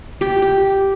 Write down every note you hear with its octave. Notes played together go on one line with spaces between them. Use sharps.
G4
G4